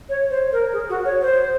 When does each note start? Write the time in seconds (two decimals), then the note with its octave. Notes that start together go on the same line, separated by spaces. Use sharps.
0.09 C#5
0.30 C5
0.52 A#4
0.73 G#4
0.89 F#4
1.05 C#5
1.21 C5